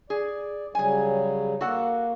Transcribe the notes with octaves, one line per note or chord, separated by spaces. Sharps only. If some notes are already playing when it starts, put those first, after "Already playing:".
G#4 D5
C#3 F#3 G3 G#4 G#5
A#3 F#4 A4 F#5